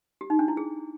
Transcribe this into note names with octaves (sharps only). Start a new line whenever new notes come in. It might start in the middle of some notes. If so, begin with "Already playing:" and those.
G4
D#4
D4
E4
G#4